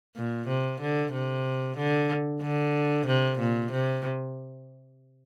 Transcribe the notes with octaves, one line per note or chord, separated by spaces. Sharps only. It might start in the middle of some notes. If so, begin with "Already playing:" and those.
A#2
C3
D3
C3
D3
D3
C3
A#2
C3